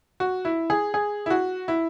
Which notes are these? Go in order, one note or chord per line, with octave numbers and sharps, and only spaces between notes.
F#4
E4
G#4
G#4
E4
F#4
E4